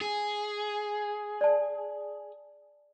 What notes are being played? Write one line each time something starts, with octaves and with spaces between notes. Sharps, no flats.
G#4
D5 A5